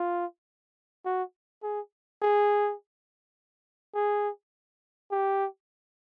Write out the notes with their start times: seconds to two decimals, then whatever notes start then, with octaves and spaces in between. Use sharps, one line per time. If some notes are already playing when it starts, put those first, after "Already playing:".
Already playing: F4
1.06 F#4
1.63 G#4
2.22 G#4
3.95 G#4
5.12 G4